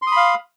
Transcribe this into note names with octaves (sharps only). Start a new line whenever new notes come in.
F5 B5 C6 D#6